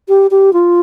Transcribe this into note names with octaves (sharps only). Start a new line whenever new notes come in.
G4
G4
F4